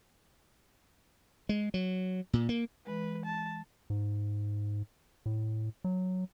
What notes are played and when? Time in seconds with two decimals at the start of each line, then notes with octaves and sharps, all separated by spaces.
1.49 G#3
1.74 F#3
2.33 A#2
2.49 A#3
2.87 E3 G#3 B4
3.26 A5
3.90 G#2
5.26 A2
5.84 F#3